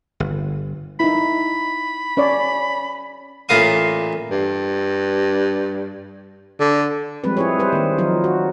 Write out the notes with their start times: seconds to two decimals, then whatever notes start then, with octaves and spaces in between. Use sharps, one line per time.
0.20 G1
1.00 D#4 E4 B5
2.17 C#4 C#5 D5
3.49 A1 A#2 A#3 F5 D#6
4.31 G2
6.59 D3
7.24 F3 G3 G#3 C4 B4
7.37 E4 G#4 C#5
7.59 G3 B4 C5
7.72 D#3 A#3
7.98 F3 F#3 D#4 F4
8.24 F#4